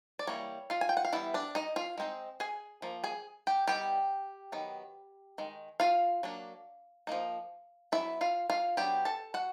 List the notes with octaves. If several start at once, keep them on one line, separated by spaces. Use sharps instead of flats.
D5
E3 G3 A#3 C#5
F4 F5
G#5
G5
F#5
F5
E3 G3 B3 E4 E5
D4 D5
D#4 D#5
F4 F5
G#3 C4 D#4
G#4 G#5
F3 A#3
G#4 G#5
G4 G5
G3 B3 D#4 G4 G5
D#3 F#3 B3
D#3 G#3
F4 F5
F#3 A#3 D4
F3 A#3 D#4
F#3 B3 D4 E4 E5
F4 F5
F4 F5
F#3 B3 D4 G4 G5
A4 A5
F#4 F#5